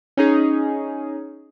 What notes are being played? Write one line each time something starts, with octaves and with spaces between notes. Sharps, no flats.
C#4 D#4 G#4